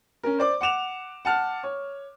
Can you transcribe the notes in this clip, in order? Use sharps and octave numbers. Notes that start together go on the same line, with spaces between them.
C#4 A#4
C5 D5 D6
F#5 D6 E7 F7
F#5 A5 F6
C#5